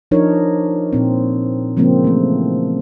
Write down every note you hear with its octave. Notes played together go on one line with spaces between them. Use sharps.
F3 D4 D#4 A#4 C#5
A#2 C4
C#3 F3 G#3 A#3 C4
E3 A3